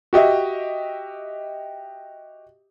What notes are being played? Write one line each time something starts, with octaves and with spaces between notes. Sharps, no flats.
F#4 G4 D#5 E5